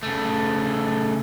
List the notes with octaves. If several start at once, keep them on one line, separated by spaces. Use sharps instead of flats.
C#3 A3